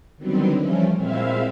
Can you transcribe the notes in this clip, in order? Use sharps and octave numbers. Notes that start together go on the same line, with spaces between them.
D3 D#3 F#3 G3 B3 C4
E3 F3 G3 A3 C#4
A#2 G#3 C4 E4 E5 F5